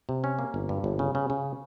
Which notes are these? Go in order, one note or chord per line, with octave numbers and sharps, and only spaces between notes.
C3
C#4
A#3
G1
G2
G1
C#3
C#3
C#3